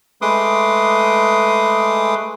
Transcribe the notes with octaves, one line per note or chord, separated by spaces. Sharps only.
G#3 A3 B4 C6 D6 D#6